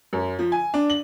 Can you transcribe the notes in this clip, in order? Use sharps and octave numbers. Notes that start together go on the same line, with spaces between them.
F#2
F3
G#5
D4
F#7